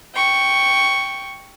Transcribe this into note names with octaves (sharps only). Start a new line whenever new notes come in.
G5 C#6